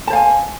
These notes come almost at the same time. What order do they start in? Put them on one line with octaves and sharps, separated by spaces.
A5 C5 F5 G#5